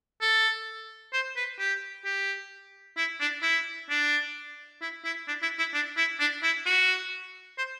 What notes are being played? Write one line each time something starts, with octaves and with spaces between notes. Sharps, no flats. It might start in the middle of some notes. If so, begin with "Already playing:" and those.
A4
C5
B4
G4
G4
E4
D4
E4
D4
E4
E4
D4
E4
E4
D4
E4
D4
E4
F#4
C5